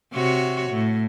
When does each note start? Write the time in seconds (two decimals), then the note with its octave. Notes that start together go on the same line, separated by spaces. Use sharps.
0.13 C3 F#4 C#5
0.71 A2